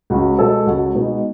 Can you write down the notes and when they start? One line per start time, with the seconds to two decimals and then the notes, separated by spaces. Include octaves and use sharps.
0.10 C#2 F#4
0.39 B2 G#3 B3 A4
0.67 C#2 F#4
0.94 B2 G#3 B3 D#4